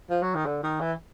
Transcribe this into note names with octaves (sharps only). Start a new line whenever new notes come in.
F3
F#3
D#3
D3
D#3
E3